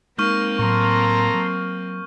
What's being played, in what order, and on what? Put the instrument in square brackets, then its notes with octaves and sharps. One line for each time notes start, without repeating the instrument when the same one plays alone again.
[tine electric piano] G#3 D#4 [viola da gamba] A#3 C4 [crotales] C#6 F6 G6
[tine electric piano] A2 F#3 [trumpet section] A4 A#5 C6
[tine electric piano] F#3